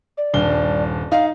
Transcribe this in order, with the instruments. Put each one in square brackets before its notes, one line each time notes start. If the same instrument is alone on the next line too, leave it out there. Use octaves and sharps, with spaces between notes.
[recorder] D5
[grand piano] D#1 G2 G7
[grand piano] D#4 [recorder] F5